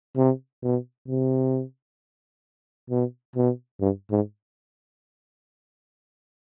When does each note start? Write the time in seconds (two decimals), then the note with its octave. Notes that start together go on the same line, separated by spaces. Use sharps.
0.17 C3
0.62 B2
1.08 C3
2.90 B2
3.35 B2
3.80 G2
4.11 G#2